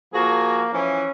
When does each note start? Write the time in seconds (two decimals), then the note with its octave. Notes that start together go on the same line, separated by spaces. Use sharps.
0.14 F3 A#3 F#4 G#4
0.73 E3 F3 C#4